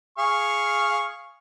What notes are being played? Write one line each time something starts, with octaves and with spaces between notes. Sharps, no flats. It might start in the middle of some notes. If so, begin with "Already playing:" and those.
G#4 F5 C#6